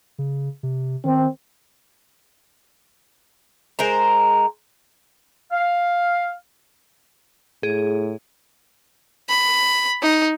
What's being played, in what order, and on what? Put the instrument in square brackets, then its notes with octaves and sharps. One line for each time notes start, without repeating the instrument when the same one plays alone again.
[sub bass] C#3
C3
[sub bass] D#3 [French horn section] C4
[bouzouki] G#3 A#4 C5 A#5
[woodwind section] F5
[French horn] A2 [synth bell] G#4
[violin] B5
D#4